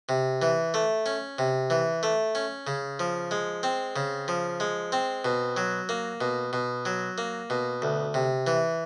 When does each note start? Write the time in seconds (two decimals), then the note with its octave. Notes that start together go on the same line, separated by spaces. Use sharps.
0.09 C3
0.42 E3
0.74 A3
1.06 C#4
1.39 C3
1.70 E3
2.03 A3
2.35 C#4
2.67 C#3
3.00 F3
3.31 G#3
3.63 C4
3.96 C#3
4.28 F3
4.60 G#3
4.92 C4
5.25 B2
5.57 F#3
5.89 A#3
6.21 B2
6.53 B2
6.86 F#3
7.18 A#3
7.50 B2
7.82 D2
8.14 C3
8.47 E3